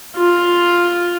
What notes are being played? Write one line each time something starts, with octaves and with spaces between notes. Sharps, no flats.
F4